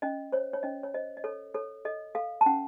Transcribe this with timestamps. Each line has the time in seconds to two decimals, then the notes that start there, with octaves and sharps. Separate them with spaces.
0.02 C#4 D#5
0.32 C5 C#5
0.53 C#5
0.63 C#4 D#5
0.83 C#5
0.94 C5 D#5
1.17 D#5
1.24 A4 C#5
1.54 A4 C#5
1.85 A4 D#5
2.15 A4 F5
2.41 A5
2.46 C#4 F#5